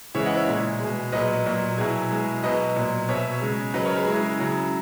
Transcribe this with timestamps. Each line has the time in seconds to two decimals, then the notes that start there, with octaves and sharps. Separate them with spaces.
0.15 C#3 E3 G#3 C#5 E5
0.25 D#5 F#5
0.36 C#5 E5
0.47 A#2 G#3
0.79 B2 G#3
1.12 A#2 F#3 B4 D#5
1.46 A#2 F#3
1.78 B2 F#3 E4 G#4
2.11 B2 G#3
2.43 B2 F#3 B4 D#5
2.76 A#2 F#3
3.08 B2 F#3 C#5 E5
3.41 C#3 G#3
3.74 C#3 F#3 B4 D#5
3.85 A#4 C#5
3.96 G#4 B4
4.06 C#3 G#3 E4 G#4
4.39 C#3 F#3